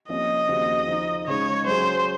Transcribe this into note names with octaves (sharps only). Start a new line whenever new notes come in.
C2 C3 F3 A#3 C#4 D#5
D#2 C#3 F3 C4 F#4
F3 C4 D#4
C#3 G#3 D#4 C#5
F#3 C#4 G#4 C5